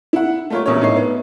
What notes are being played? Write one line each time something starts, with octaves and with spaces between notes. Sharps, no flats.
E4 F#5
A3 A#3 F4 A#4 C#5
E1 A#1 E2 A#3 C#4 C#5
A2 D#4 C#5 C7
B3